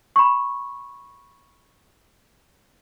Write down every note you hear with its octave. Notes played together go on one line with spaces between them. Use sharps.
B5 C#6